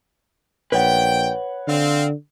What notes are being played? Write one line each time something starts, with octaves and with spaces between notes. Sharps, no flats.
A#1 B4 C#5 F#5 G5
D3 C4 F5